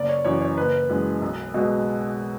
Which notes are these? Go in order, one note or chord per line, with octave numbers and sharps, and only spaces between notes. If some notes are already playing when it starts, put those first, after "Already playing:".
Already playing: F#1 D5
C#5
F#2 E3 C#5
C#5
F#1 B4
F#2 E3 G#3
B1
B2 G#3